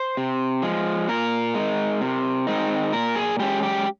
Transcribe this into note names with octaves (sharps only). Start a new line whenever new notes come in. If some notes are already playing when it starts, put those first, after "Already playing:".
Already playing: C5
C3
F3 G#3
A#2 A#4
G#3
D#4
C3
D#3 G#3 C4 D#4
A#2 A#4
G#4
G#3 C#4 G4
G4